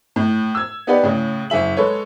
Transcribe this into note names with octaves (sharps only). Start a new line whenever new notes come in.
A2
E6 G#6
B3 D#4 G4 B4 D5 F#5
A2 C#3
F#1 G#4 E5 F#7
G#3 A4 B4 C#5